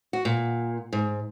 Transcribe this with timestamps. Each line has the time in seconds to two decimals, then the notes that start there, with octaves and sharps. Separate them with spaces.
0.13 F#4
0.25 A#2
0.93 G#2